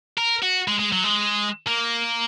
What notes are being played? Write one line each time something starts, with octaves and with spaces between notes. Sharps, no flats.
A#4
F#4
G#3
G#3
F#3
G#3
A#3